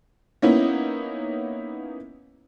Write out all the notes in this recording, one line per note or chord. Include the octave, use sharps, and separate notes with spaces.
A#3 B3 C#4 D#4 E4